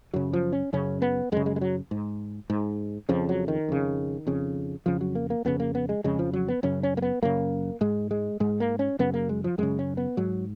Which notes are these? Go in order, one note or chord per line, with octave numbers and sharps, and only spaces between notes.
F#2 C#3 F#3
F3
C#4
F#2 C#3 C#4
B3
F#2 C#3 G#3
G#3
G#3
F#3
G#2
G#2
F2 C#3 F3
F#3
D#3
F2 C#3
F2 C#3
F2 C#3 F3
F#3
A#3
A#3
F2 C#3 B3
A#3
B3
G#3
F2 C#3 G#3
F3
F#3
B3
F#2 C#3 C#4
C#4
A#3
B3
F#2 C#3 A#3
G#2 G#3
G#3
G#2 G#3
A#3
C#4
F#2 C#3 B3
A#3
G#3
F3
F#2 C#3 G#3
C#4
B3
G#2 F#3